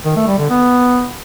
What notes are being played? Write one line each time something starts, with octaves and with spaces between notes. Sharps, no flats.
D#3
A3
G3
D3
B3